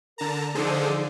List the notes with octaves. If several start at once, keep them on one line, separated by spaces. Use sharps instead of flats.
D3 A#4 A5 A#5
D3 F3 D#4 G#4 A4 C5